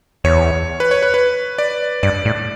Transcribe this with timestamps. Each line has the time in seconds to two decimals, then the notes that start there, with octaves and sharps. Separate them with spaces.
0.24 E2 C#5
0.80 B4
0.91 C#5
1.02 B4
1.14 B4
1.58 D5
2.03 G2 D5
2.25 A2